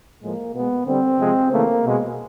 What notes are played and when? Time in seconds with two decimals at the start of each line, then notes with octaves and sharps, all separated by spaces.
0.22 A2 F3 G#3 A#3
0.54 B2 G#3 B3
0.86 D3 G3 C4
1.19 C3 F3 G#3
1.51 C#3 E3 A3 A#3
1.84 B2 G#3